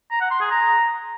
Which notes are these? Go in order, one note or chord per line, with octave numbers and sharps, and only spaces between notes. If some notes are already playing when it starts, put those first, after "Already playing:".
A#5
F#5
C6
G#4
A#5